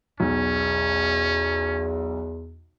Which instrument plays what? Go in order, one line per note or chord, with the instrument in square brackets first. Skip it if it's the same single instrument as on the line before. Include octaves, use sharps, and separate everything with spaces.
[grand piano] B1 [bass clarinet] E2 [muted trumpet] C#4